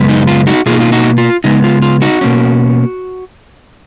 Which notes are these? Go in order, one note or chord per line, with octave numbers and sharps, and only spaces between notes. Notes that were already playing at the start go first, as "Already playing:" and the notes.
Already playing: F#2 C#3 G#3 B3
D#4
F4
D#4 F#4
B2 A#3 D#4 F4 G#4
F4
D#4 F#4
F4
C#3 G#3 B3 D#4
F4
F4
D#4 F#4
B2 A#3 C#4